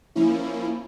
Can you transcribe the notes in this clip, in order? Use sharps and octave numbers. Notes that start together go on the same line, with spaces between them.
F3 A#3 C#4 E4